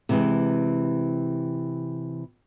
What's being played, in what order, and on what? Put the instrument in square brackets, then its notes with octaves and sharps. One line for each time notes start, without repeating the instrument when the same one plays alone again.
[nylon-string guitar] C3 E3 G#3